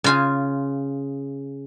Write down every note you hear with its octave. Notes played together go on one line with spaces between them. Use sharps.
C#3 F4 G#5